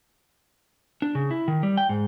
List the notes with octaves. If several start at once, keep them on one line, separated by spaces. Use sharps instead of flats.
D4
C#3
E4
D#3
G3
G5
G#2